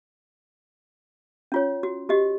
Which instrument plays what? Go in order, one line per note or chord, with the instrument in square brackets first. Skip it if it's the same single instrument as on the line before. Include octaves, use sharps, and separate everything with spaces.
[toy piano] C#4 F4 C#5
F#4
F#4 G4 D#5